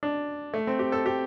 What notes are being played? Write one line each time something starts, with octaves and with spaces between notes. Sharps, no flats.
D4
A3
C4
G4
A4
G4